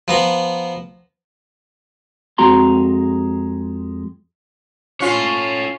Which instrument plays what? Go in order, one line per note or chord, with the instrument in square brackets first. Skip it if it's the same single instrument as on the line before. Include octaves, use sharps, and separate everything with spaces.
[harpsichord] F3 B3 A#5
[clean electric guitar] F2 G#3 C4 F#4 A#5 C6
[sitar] C#4 F4 [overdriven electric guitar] A4 C#5